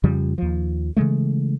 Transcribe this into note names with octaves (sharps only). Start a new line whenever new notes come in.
F2 C#3 F3 G3
D#2 F3
C#3 E3 G#3 A3